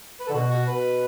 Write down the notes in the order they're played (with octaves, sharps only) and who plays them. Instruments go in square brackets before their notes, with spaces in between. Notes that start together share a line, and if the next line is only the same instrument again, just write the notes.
[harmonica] B4
A4
[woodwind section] D3
[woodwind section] B2 [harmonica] F#4
[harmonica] F#4
[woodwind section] B2 [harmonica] B4